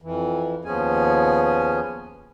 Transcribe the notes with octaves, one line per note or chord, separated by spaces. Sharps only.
F2 E3
D#2 F3 B3 C#4 G#4 G#5